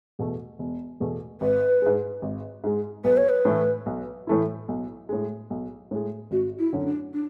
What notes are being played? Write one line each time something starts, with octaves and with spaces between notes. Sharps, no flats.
E2 B2 A3
E1
E2 B2 A3
G#1 B4
G#2 G#3
G#1
G#2 G#3
B1 B4
C#5
B4
A2 E3 A3 E4
B1
A2 E3 A3 E4
B1
A2 G#3
B1
A2 G#3
G#1 F#4
E4
F#2 D3 F#3 A3
C#4
D4
D4